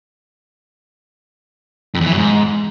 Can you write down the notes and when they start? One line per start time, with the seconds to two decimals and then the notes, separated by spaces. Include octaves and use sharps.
1.95 F2
2.00 E2
2.06 E3
2.12 F#2
2.18 G#2